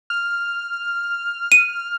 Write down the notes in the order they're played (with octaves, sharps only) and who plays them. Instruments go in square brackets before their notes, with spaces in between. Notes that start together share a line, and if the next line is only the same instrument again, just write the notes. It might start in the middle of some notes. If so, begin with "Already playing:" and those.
[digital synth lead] F6
[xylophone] D#7